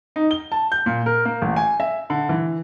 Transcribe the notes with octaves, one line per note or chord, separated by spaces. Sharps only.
D#4
G7
A5
G6
A#2
A#4
A#3
A1
G#5
E5
D3
E3